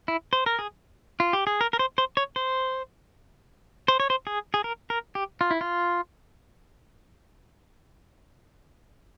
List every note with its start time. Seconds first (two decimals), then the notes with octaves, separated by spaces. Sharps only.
0.08 E4
0.33 C5
0.46 A#4
0.59 G#4
1.20 F4
1.33 G4
1.47 G#4
1.61 A#4
1.73 A#4
1.79 C5
1.98 C5
2.17 C#5
2.36 C5
3.88 C5
4.00 C#5
4.10 C5
4.27 G#4
4.54 G#4
4.64 A#4
4.90 A#4
5.15 G4
5.41 F4
5.51 E4
5.61 F4